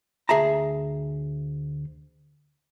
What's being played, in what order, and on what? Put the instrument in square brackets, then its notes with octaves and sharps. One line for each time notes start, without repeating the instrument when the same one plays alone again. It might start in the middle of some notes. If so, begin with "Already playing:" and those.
[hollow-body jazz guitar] D2 G#4 E5 A5 A#5